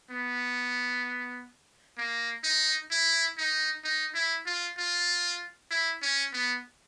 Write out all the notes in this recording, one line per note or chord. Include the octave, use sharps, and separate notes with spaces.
B3
A#3
D#4
E4
D#4
D#4
E4
F4
F4
E4
C#4
B3